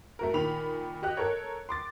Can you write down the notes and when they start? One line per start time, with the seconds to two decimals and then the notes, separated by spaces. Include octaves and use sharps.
0.19 A3 F#4 A#4
0.34 A#2 D#3 B5 F7
1.02 F#4 G4 D#5 F#6
1.17 A4 A#4 C#5
1.69 C6 D6 A6